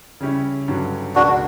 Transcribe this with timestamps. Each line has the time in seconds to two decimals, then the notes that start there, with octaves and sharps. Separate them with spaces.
0.20 C#3 G3 C#4 E4
0.68 G2 D3 F#3 C#4
1.15 C#2 B2 A#3 D4 E4 F#4